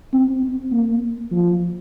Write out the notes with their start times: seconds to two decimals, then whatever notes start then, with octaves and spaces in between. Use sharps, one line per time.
0.13 C4
0.43 C4
0.72 A#3
1.31 F3